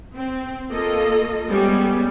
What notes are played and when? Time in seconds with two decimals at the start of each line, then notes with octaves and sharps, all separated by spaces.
0.15 C4
0.71 A#3 F4 A4 D#5
1.47 G3 G#3 B3 C#4